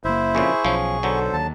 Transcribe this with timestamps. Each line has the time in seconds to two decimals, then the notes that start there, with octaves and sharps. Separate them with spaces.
0.05 F#1 A#3 E4 C5 E5
0.35 F2 A#2 C#3 G#4 C#6
0.65 B1 F3 C#4
1.03 D3 F#3 A4 C5
1.33 D#2 A5